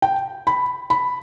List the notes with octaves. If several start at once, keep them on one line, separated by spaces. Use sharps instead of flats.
G5
B5
B5